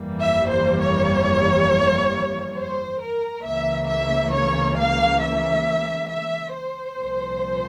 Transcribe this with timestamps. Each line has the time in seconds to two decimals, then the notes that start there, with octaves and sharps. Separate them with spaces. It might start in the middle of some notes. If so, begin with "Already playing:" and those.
Already playing: G1 F2 E3 G3 A#3
0.21 E5
0.51 C5
0.80 C#5
2.56 C5
3.01 A#4
3.45 C#2 C#3 E3 A#3 E5
3.88 E5
4.33 C#5
4.77 F5
5.21 E5
6.09 E5
6.53 C5
6.97 C2 A#2 F3